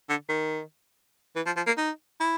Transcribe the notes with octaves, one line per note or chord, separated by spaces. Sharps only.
D3
D#3
E3
F3
F3
A#3
D#4
E4